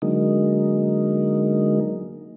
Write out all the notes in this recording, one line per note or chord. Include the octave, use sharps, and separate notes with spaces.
D3 F#3 G#3 A#3 D#4